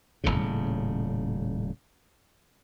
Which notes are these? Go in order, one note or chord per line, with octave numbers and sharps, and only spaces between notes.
D#1 G#1 A2 C#3